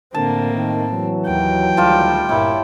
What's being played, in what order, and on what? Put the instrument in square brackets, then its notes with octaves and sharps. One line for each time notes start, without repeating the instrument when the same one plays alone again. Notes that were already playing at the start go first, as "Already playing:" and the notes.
[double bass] A2 C4 [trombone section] D3 [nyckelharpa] A#3 [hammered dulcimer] A5
[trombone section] D#3
E3 F#3
[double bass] D#2 [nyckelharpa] G5
[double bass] D2 D#3 [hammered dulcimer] G3 F4 A5
[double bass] G1 E4 [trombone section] A#2 [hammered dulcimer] C#5